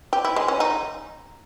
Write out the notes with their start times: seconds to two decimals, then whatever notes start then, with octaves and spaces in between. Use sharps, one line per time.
0.13 G4
0.25 E4
0.36 G#3
0.48 C#4
0.60 D#4